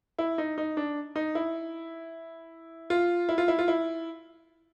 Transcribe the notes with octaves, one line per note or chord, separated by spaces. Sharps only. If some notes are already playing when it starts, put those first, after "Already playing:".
E4
D#4
D#4
D4
D#4
E4
F4
E4
F4
E4
F4
E4